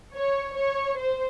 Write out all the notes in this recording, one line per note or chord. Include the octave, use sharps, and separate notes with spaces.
C#5
C#5
C5